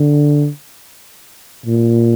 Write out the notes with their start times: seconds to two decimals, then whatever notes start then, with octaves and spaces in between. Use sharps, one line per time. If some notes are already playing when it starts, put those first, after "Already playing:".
Already playing: D3
1.66 A#2